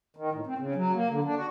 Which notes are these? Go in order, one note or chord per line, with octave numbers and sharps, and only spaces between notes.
D#3
A2
C4
C#3
F#3
A#3
D3
D4
F#4